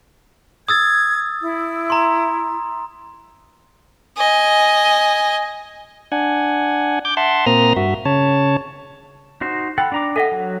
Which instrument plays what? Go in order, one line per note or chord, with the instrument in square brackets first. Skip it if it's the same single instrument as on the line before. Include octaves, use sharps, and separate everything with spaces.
[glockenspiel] D#6 E6 A6 [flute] G#6
[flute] E4
[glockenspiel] A#5 C6
[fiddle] D#5 G#5
[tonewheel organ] D4 F#5 G#5
D6 G6
E5 F#5 A5 C6
A#2 A#3 C4 A#5 D#6 F6
G2 F#4 E5
C#3 C#5 A5
[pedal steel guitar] D#4 F#4 C5
[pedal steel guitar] A4 F#5 [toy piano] G5 B5
[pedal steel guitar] D4 A#5 D6
[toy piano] A4 F#5 [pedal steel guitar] D#5 E5 G#5
[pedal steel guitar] F#3